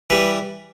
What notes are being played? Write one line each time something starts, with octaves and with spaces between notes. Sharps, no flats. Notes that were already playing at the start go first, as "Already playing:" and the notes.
E3 G3 B4